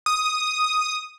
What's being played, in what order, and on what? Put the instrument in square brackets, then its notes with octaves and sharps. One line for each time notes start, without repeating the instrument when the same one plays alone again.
[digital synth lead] D#6